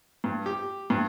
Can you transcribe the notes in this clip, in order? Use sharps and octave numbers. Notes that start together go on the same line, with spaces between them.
G2
G4
G2